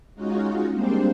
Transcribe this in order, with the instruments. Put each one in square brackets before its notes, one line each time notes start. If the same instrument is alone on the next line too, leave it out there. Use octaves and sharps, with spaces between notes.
[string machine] G#3 C#4 D#4 F4 F#4
G3 G#3 A#3 C4 D4 C5